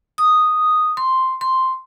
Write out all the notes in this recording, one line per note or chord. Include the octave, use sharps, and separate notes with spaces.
D#6
C6
C6